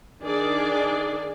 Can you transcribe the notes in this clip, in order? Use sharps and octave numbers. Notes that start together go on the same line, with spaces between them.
D#3 D4 G#4 D5